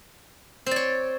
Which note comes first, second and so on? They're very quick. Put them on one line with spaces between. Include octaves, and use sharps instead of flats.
C4 D5 C#5